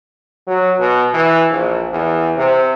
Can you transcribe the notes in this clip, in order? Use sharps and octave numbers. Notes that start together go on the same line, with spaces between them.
F#3
B2
E3
A#1
E2
C3